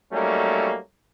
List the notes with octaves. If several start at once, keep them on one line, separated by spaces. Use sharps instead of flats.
F#3 G3 A3 A#3 C#4 D#4